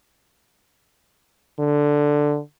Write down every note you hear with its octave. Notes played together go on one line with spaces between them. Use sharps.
D3